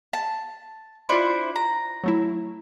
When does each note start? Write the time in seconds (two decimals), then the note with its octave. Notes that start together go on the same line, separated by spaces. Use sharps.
0.13 A5
1.09 D4 E4 F4 C5 C#7
1.56 A#5
2.04 F#3 A3 E4